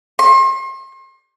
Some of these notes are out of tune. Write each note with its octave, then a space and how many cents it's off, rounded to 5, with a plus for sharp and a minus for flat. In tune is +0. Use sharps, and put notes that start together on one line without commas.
C6 +40